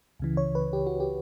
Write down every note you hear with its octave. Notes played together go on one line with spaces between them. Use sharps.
C#2 C#3 E3
C#5
B4
G4
F#4
G4